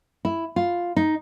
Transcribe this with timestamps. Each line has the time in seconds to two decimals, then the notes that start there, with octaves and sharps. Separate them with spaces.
0.25 E4
0.56 F4
0.96 D#4